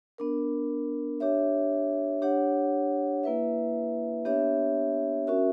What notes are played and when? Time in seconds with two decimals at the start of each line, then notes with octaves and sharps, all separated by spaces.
0.18 B3 D4 A#4
1.20 D4 G4 C#5 E5
2.22 D4 G4 C#5 F#5
3.23 A#3 E4 B4 E5
4.25 B3 D4 G4 C#5 E5
5.27 C#4 F#4 A#4 E5